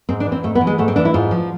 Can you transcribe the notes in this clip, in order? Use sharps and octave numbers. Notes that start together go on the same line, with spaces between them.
G#2 C4
D4
E3
C4
G#2 A3
B3
E3
G#3
G#2 A3
C4
E3 D4
E4
G#2 F4
F3